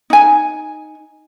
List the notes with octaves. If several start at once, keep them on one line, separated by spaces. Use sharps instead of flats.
D#4 G#5